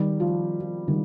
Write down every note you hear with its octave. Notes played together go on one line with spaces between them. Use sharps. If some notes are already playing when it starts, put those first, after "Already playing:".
Already playing: D#3 G3
F3
F3
D#3 G3